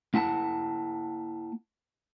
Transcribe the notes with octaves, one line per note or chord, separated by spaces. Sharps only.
A#3 E4 F#5 A5